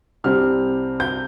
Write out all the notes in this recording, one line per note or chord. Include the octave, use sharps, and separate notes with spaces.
C2 C3 G3 C4 F6
G6